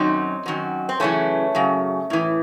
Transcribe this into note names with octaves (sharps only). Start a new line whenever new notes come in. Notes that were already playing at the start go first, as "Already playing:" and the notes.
Already playing: F#2 D#3 F#3 C4 D#4
F#2 D#3 F#3
C4
F#2 C#3 E3 A3 C#4
F#2 C#3
A2 E3